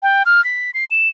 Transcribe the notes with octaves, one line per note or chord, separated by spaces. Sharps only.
G5
F6
B6
C7
E7